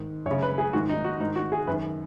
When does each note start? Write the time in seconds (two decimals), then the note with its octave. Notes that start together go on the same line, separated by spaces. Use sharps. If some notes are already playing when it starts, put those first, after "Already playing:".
Already playing: G#2 D#3
0.26 F#2 C#5
0.31 C#3
0.42 B4
0.58 G#4
0.73 G#2 D#3 F#4
0.89 D#4
1.04 F#4
1.20 G#2 D#3 D#4
1.36 F#4
1.52 G#4
1.67 F#2 D#3 B4